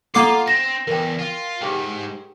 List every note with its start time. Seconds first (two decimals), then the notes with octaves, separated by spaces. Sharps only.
0.14 A#3 F4 A4 F#5 A#5 D6 C7
0.48 C4 A#6 E7
0.87 E2 A#4 G5
1.19 F4
1.61 B1 G#2 G4 G#4 G5